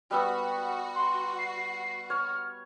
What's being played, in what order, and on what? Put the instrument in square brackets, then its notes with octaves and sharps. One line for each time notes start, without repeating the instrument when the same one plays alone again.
[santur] G3 B3 E6 [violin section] F#4
[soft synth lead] C6
C7
[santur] C#5 [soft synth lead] F6